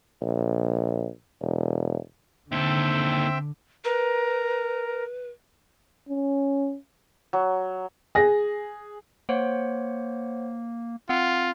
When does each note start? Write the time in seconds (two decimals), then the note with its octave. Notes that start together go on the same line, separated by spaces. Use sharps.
0.22 A#1
1.41 E1
2.52 D#2 D3 C4 A4 E5 G5
3.84 A#4 B4
6.09 C#4
7.33 F#3
8.15 G#4 A#6
9.29 A#3 C5 C#5 F#5
11.09 C4 F4 F#5